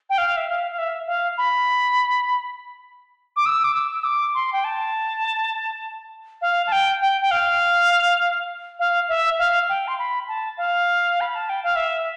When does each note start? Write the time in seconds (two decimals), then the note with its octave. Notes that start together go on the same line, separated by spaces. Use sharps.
0.10 G5
0.18 F5
0.37 E5
0.48 F5
0.71 F5
0.78 E5
1.07 F5
1.38 B5
3.36 D6
3.46 E6
3.64 D6
3.74 E6
3.99 E6
4.04 D6
4.34 C6
4.53 G5
4.64 A5
6.42 F5
6.67 A5
6.72 G5
7.01 G5
7.21 G5
7.31 F5
8.79 F5
9.09 E5
9.39 F5
9.69 G5
9.88 C6
9.98 B5
10.28 A5
10.58 F5
11.21 B5
11.35 A5
11.49 G5
11.63 F5
11.76 E5